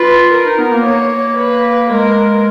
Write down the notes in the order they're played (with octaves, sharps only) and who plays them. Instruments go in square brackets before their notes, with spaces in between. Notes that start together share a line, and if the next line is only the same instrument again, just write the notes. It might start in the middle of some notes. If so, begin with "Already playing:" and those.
Already playing: [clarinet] F4 [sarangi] B4
[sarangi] A#4
[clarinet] D#4
B3
A#3
[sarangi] C#5
B4
[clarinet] G#3 [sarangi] A#4